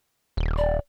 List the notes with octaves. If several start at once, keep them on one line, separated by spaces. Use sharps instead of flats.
D#1
D5